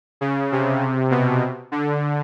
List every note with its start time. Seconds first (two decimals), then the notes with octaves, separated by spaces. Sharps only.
0.21 C#3
0.52 C3
1.11 B2
1.72 D3